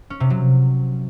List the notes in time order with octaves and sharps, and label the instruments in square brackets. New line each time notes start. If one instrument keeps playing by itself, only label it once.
[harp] C#4
C3
F#3